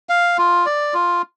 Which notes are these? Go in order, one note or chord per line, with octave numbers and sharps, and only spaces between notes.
F5
F4
D5
F4